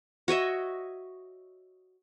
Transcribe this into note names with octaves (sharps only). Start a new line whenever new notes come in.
F#4 C#5 D#5 E5